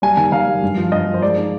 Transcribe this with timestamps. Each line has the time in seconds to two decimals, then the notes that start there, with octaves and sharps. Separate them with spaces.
0.02 G3 G#5
0.17 D#3 G#5
0.32 D#3 F5
0.47 G3
0.63 G2
0.77 F3
0.92 G2 D#5
1.07 F3
1.14 C5
1.22 G#3 D5
1.37 D#4